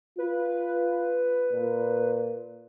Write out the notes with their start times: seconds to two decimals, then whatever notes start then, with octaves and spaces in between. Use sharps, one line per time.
0.18 F4 B4
1.53 A#2